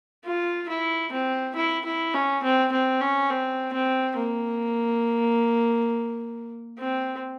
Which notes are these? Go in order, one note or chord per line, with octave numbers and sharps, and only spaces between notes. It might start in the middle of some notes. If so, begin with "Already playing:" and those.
F4
E4
C4
E4
E4
C#4
C4
C4
C#4
C4
C4
A#3
C4